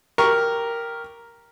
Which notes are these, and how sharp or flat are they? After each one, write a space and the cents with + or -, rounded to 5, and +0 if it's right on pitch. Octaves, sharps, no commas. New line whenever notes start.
G4 +0 A#4 +0 C#6 +0